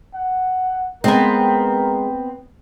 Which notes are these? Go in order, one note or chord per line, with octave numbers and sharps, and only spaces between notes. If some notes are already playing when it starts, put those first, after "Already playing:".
F#5
G#3 B3 C4 A#4